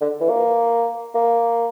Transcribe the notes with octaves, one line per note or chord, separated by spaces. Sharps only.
D3
E3
A#3
A#3